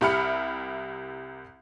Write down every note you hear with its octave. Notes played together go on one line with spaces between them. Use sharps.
C2 G4 E5 B5 F6 C#7